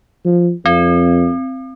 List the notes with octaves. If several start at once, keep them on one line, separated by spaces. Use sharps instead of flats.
F3
F2 C4